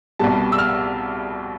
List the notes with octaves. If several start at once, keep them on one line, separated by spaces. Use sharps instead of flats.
C2 B2 G3 A5
E6
F6